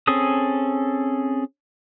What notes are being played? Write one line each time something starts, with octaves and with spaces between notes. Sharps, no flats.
C4 C#4 G#4 A4 D#6